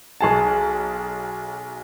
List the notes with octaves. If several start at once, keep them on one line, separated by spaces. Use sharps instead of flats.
B1 G#4 A5